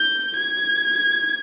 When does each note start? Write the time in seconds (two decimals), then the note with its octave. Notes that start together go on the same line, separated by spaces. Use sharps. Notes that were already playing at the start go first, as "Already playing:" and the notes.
Already playing: G6
0.36 G#6